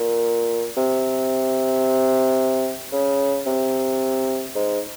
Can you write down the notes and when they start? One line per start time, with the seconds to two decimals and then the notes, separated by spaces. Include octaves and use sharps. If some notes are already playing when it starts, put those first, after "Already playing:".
Already playing: A#2
0.77 C3
2.92 C#3
3.46 C3
4.55 G#2